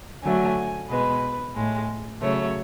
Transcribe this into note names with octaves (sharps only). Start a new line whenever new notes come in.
D3 F#3 A3 G#5
B2 G#3 B4
A2 G#3
C#3 F#3 A3 C#5